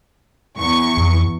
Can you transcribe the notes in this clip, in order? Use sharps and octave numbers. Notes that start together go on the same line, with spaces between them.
E2 C#6
F2